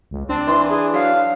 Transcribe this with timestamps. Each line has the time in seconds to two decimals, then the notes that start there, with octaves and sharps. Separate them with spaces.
0.11 C#2
0.29 C4 D4
0.47 E3 C6
0.69 G#4
0.93 F#3 F5